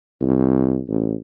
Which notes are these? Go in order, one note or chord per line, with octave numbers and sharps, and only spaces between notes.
C2
A1